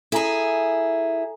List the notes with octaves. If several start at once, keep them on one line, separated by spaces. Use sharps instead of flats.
E4 G#4 A4 G#5 A#5